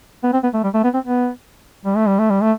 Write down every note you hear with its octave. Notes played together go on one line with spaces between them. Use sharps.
B3
C4
B3
A3
G3
A3
B3
C4
B3
G3
A3
G3
A3
G3
A3